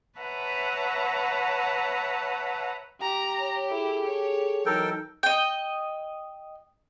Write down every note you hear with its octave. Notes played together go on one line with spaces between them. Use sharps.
B4 C#5 E5 F#5 A5 A#5
G4 A#5
C#5
E4 G#4 A4
C#5
E3 F#3 D#4 A4 A#4 G5
D#5 G5